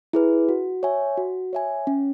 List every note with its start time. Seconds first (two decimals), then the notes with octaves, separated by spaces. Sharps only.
0.13 E4 G#4 B4
0.49 F#4
0.83 C#5 E5 G#5
1.17 F#4
1.53 C#5 E5 G#5
1.87 C#4